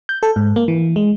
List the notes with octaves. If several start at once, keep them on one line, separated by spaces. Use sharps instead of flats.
G6
A4
G#2
A#3
E3
G#3